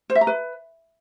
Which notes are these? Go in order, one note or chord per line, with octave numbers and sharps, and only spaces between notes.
C5
E5
A#5
B4